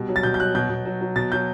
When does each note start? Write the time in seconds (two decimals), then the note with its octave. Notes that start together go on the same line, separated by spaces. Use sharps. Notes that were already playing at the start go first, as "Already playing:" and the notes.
Already playing: B2 G3
0.08 F#3
0.16 A6
0.23 B2 G6
0.34 G6
0.39 F#3 F#6
0.55 B2 G6
0.70 B2
0.85 F#3
1.01 F#3
1.16 B2 A6
1.32 F#3 G6